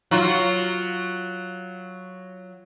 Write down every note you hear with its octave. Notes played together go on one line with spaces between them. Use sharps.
F#3 F4